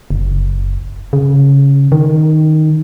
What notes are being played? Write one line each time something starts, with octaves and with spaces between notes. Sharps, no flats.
F#1
C#3
D#3